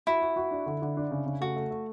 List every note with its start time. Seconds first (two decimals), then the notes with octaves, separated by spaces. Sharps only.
0.07 E4 F#4
0.22 F#4
0.36 F#4
0.51 D4
0.66 D3
0.82 D3
0.97 D4
1.11 C#3
1.26 C#3
1.41 A3 F#4
1.56 A3
1.71 A3